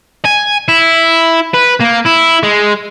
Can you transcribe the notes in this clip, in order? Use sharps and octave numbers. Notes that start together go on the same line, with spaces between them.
G#5
E4
B4
A#3
E4
G#3